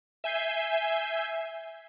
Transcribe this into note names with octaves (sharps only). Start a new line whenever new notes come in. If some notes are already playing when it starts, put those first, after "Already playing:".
E5 G#5 G6 C7